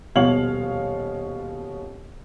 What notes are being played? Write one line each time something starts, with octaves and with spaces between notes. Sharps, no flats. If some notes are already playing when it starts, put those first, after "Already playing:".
D#1 B2 F3 C#5 F5 F#7